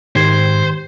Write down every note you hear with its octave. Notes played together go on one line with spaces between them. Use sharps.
G#2 D#3 G4 C5 G#6